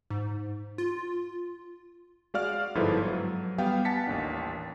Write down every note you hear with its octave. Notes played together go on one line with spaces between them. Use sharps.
G#2
F4
G#3 F#4 D5 F5 F6
G1 G#2 F3 E4 A4 B4
F#3
G3 B3 F5 G5
F#5 G#5 A5 A6 B6 C#7
A1 D#2 D4